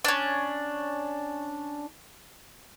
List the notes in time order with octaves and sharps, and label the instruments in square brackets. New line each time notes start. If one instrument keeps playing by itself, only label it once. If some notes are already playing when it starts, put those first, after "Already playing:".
[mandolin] C#4 D4